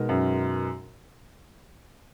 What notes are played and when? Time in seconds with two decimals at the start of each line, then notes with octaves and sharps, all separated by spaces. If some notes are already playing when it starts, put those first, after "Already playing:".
Already playing: B2 G#3 D#4 A#4
0.09 F#2